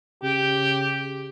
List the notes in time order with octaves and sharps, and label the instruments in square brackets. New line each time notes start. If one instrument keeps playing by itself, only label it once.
[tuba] C#3 [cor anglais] G4